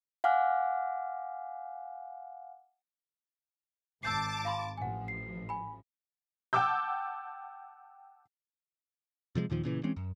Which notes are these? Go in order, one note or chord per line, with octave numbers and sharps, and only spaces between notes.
F5 F#5 G#5 D6 F6 F#6
G#1 A5 D6 E6 G6 C7
F5 B5 C6
A1 F3 F#5 G#5
C7
G#5 B5
F#5 G5 A5 D6 E6 G6
C3 F3 F#3 G#3
D#2 A#2 D#3 F3
A#2 C#3 E3
E3 G#3 C4 C#4
F#2